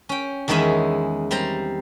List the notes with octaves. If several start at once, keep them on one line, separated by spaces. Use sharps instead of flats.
C#4 G5
E2 D#3 G#3 C#4 E4 E5
G3 C4 C5 A#5